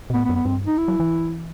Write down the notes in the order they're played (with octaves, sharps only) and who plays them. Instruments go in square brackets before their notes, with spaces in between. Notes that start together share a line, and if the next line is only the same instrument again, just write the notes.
[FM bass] B2
[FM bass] A2 [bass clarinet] B3
[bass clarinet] B3
[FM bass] F#2
[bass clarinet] B3
[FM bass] G2 [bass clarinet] C4
[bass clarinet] D#4
E4
[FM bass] F#3
E3